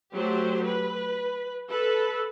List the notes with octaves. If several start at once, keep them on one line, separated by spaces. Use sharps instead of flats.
F#3 A3 G4 C5
B4
A4 B4